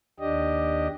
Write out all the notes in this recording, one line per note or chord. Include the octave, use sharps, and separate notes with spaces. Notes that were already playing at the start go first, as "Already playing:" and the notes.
D#2 D4 G4 D#5